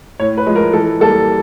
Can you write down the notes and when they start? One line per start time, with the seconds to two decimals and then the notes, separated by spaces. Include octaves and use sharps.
0.20 A2 C#5
0.38 B4
0.46 F3 G#3
0.56 A#4
0.73 E3 A4
1.00 G3 A#3 A4